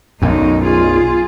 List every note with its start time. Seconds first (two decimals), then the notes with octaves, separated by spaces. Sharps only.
0.22 B1 F#2 F#3 D#4
0.65 F4 G#4